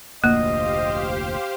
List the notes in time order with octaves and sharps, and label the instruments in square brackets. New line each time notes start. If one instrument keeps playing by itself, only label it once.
[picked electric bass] F1 D2 A#2 [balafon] A#3 [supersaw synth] G4 C5 F5 [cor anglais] D#5